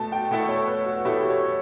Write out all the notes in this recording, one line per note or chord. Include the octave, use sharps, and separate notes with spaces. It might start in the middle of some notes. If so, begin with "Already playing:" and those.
Already playing: B2 A3 A5
G5
B2 A3 E4 A4 F#5
C#5
B4
F#4
B2 A3 E4 G4 A4
C#5